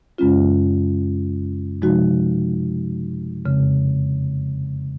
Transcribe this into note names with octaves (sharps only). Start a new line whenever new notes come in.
F#2 C#3 G#3 C#4 F4
C3 F3 G#3 D#4 F#4
F2 C#3 G#3 C4